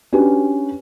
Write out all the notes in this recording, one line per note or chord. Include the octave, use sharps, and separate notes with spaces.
C#4 D4 F#4 G4 B4